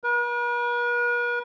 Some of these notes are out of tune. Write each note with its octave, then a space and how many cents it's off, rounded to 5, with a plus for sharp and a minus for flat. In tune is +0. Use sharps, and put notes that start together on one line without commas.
B4 -45